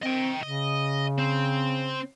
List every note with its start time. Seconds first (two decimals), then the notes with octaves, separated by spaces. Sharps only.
0.02 C4 D#5 G5
0.43 C#3 D#5
1.19 C4